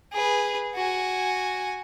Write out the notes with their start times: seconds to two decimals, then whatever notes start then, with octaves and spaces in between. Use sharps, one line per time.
0.12 G#4 B4
0.75 F#4 G#5